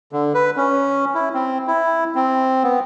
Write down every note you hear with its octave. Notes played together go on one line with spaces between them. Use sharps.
D3
B4
C#4
E4
C4
E4
C4
B3